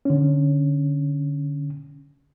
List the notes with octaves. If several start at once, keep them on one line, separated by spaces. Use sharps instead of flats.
D3 C#4